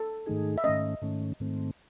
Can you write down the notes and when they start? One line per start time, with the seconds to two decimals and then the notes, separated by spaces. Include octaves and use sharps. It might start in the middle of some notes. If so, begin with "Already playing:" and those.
Already playing: A4
0.26 G#2 D#3 A3 D#4 G#4
0.58 E5
0.64 G#2 D#3 A3 C#4 D#5
1.02 G#2 D#3 A3 C#4
1.40 G#2 D#3 A3 C4